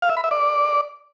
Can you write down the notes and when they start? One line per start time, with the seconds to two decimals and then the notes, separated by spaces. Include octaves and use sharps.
0.02 F5
0.10 E5
0.17 B5
0.24 E5
0.31 D5